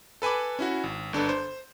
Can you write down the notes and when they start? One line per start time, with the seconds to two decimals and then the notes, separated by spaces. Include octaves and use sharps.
0.22 A4 B4 G#5 B5 D6
0.59 C#4 E4 F#4
0.84 G#1
1.13 G1 D4 A4 B4
1.29 C5